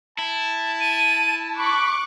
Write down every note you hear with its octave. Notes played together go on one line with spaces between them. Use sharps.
E4 A5
D#7
B5 C#6 D6 F#6